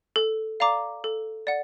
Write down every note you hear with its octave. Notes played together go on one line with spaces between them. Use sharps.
A4
D5 F5 A#5 D6
A4
D5 F#5